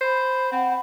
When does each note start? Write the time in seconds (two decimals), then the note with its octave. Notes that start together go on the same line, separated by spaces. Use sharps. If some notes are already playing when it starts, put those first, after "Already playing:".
0.01 C5 B5
0.52 C4 F#5